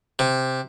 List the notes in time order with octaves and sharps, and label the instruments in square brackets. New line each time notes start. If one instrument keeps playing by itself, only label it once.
[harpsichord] C3